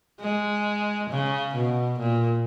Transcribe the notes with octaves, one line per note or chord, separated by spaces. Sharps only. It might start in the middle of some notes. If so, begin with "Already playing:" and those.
G#3
C#3
B2
A#2